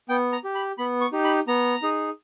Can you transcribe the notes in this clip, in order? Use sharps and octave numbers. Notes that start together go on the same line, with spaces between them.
B3 G5
A#5
G4
B5
B3 B5
C#6
D#4 G4
B5
B3 A#5
D#4 G#4